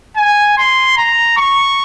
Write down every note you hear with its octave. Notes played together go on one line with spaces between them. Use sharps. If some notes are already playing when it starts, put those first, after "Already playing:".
G#5
C6
A#5
C#6